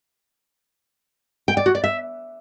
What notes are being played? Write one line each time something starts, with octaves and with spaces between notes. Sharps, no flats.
G5
D5
F#4
D5
E5